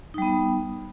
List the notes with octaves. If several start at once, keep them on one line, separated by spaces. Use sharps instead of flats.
G3 B3 D#4